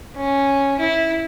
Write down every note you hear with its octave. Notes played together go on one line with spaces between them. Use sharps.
C#4
E4